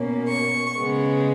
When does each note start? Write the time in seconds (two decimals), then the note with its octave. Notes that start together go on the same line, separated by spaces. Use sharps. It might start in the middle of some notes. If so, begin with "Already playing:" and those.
Already playing: B2 A#3 C#4
0.27 C#6
0.76 C#3 G#3 B3